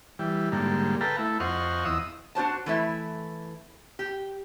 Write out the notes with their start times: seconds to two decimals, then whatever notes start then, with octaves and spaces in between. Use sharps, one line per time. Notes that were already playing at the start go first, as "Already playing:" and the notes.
0.19 E3 G3
0.52 G#2 D3 G3 A#3
1.01 A4 B4 F5 G5 A#5
1.18 A3 E4
1.40 F2 C5 D#5 F5 F#5 C#6
1.85 E2 D#5 D#6 E6
2.35 D4 F#4 C5 A5
2.66 E3 A3 E4
3.99 G4